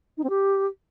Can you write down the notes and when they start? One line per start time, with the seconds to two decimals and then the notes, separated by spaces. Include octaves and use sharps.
0.18 D#4
0.24 C4
0.30 G4